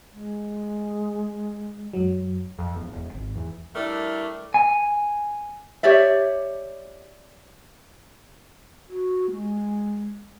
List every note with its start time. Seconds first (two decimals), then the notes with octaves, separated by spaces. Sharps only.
0.13 G#3
1.93 F#2 F#3
2.59 F2
2.74 E1
2.92 E1
3.15 G#1
3.36 E2
3.75 G3 A3 D4 E4 A#4
4.54 G#5
5.83 G4 C#5 D5 E5
8.89 F#4
9.31 G#3